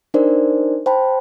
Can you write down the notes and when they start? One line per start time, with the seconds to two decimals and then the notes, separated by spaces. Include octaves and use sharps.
0.14 D4 D#4 A#4 C5 D5
0.86 C5 G5 A5 B5